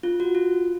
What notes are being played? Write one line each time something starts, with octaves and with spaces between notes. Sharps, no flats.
F4
F#4
F4